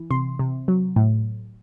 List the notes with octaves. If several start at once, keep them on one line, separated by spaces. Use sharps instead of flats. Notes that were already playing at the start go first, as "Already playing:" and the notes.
Already playing: E3
C3 C6
C3
F#3
A2